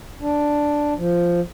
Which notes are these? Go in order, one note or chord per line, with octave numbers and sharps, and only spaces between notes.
D4
F3